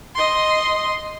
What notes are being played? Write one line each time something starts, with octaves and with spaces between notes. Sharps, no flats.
D#5 C6